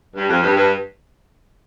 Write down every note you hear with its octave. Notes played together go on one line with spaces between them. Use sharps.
G2
F2
G2
G2